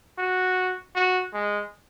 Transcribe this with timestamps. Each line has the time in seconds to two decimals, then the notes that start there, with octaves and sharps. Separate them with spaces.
0.18 F#4
0.96 F#4
1.33 G#3